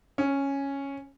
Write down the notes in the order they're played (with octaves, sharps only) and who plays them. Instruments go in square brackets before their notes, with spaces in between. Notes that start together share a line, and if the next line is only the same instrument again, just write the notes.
[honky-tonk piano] C#4